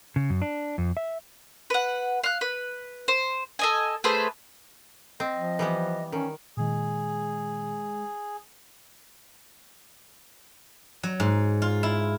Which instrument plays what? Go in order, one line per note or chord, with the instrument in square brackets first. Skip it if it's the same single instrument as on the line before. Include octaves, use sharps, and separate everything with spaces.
[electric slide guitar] C#3
F#2
D4
F2
E5
[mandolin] B4 F#5
F5 F#6
B4
C5
A4 D#5 G#5
A3 G#4 B4 C5
[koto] C4 [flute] D#5
[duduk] F3
[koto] E3 G3 B3
[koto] D#3 [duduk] C#4
[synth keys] A#2 D#3 [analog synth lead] G#3 [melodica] G#4
[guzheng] F#3
G#2
F4
E4